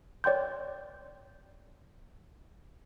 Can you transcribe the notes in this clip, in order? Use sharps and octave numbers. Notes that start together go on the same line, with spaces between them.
C#5 D5 G5 C6 G6